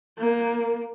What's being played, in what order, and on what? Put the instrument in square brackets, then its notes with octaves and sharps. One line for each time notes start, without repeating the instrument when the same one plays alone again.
[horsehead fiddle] A#3